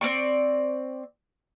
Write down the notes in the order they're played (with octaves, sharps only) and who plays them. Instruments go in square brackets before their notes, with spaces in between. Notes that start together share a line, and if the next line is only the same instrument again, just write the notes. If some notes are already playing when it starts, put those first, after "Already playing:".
[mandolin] C4 C#4 D5 C#6